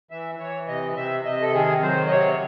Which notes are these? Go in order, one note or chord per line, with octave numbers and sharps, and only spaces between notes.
E3 E5
E3 C#5
C3 D#5
C3 E5
C3 D#5
A4
D#3 G#4
F#3 C5
D#5
C3 C#5